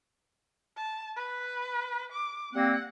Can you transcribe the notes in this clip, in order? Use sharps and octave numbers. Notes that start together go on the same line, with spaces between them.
A5
B4
D6
G3 A#3 C4 F#5